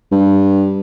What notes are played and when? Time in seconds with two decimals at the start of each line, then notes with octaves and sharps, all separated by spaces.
0.12 G2